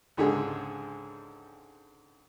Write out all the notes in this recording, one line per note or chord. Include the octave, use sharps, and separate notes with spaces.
C#2 G#2 D3 G#4